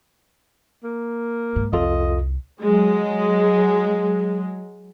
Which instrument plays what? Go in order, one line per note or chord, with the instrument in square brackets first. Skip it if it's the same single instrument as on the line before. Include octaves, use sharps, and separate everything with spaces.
[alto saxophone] A#3
[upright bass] G#2
[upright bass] C2 [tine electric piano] F2 F4 A4 [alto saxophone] D#5
[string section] F#3 G#3